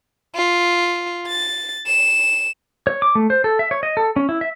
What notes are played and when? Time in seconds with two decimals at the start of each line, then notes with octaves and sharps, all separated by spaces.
0.35 F4
1.28 A6
1.87 E7
2.87 C#5
3.02 D6
3.15 A3
3.30 C5
3.44 A4
3.59 E5
3.71 C#5
3.83 D#5
3.97 A4
4.16 C#4
4.29 E4
4.41 E5